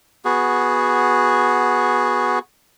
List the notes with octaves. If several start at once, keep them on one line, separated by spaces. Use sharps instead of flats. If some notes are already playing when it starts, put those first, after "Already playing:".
B3 F#4 G#4